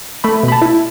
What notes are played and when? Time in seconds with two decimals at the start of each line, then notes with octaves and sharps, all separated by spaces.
0.24 A3 B5
0.43 B2
0.48 B5
0.52 A5
0.62 E4